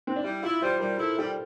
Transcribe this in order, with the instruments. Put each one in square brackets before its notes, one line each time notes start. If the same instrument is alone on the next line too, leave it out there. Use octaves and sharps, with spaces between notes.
[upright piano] C4
D4
[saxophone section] G3 [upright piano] E4
[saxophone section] E4 [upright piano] F4
[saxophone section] G3 [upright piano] C5
[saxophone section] G3 [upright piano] A#4
[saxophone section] E4 [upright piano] A4
[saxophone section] G3 [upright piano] G4